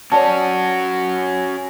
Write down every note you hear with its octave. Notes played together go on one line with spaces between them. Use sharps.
C#4 F#4 C#5 D5 A5